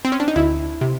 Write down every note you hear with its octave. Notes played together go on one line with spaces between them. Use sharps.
C4
C#4
D4
D#4
D2 E4
C3